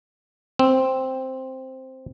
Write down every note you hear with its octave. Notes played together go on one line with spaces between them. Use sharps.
C4